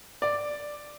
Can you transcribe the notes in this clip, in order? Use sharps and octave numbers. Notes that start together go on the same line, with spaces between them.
D5